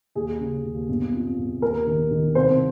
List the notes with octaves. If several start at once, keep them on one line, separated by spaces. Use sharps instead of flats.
D#2 G#4
C#3
D#2
G1
F2
G1
D#2 A#4
D#3
D#3
C2 C5